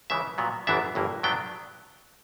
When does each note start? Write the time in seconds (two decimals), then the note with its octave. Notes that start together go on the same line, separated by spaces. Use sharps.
0.10 C#2 C#3 E3 E5
0.38 A#2 F#3 B3
0.67 G1 F#2 E3 B3 D4 E5
0.95 G1 G2 E3 A#3
1.23 G2 F#3 B3 D4 G5